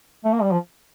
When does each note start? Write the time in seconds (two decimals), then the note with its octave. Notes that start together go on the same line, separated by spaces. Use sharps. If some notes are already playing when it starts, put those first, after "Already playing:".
0.25 A3
0.33 A#3
0.42 G3
0.51 F3